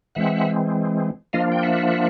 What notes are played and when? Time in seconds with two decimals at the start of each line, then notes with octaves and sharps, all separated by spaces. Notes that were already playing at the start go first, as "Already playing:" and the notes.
0.15 E3 G#3 C4 E5 F#5
1.33 F3 A#3 D4 F4 D#5 F5
1.52 G5
1.63 E5 F#5